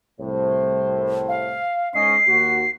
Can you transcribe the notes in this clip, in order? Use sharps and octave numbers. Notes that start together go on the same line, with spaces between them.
C2 A2 C5
F5
G#2 C#4 D#5 C7
D#2 F#4